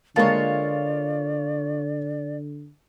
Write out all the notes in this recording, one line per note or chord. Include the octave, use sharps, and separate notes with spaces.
D3 G#3 A#3 F4 C#5 D5 A5